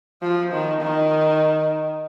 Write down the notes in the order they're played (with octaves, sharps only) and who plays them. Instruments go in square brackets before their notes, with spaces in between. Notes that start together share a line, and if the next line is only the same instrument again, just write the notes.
[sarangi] F3
D#3
D#3